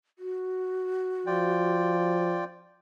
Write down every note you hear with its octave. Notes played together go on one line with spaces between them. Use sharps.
F#4
F3 F4 D5 G5